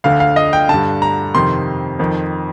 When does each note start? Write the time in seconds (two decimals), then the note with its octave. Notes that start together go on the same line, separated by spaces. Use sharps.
0.04 D2 D3 F5
0.20 F5
0.36 D#5
0.53 G5
0.69 G2 D3 A5
1.02 A#5
1.34 F2 C3 D#3 C6
1.99 F2 D#3